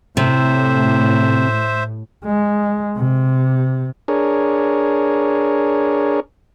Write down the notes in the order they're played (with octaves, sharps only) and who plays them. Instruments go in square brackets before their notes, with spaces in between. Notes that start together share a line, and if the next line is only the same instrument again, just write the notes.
[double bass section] A2 [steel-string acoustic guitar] C3 [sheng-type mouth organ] C5 E5
[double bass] G#3
C3
[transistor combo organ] D4 G#4 A#4 C#5